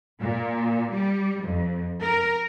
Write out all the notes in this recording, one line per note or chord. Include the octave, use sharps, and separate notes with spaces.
A#2
G3
F2
A#4